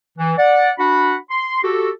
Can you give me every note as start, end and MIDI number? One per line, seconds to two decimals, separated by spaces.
0.17 0.33 52
0.38 0.70 74
0.38 0.70 78
0.78 1.15 62
0.78 1.15 66
0.78 1.15 78
0.78 1.15 83
1.30 1.58 84
1.63 1.90 66
1.63 1.90 67
1.63 1.90 69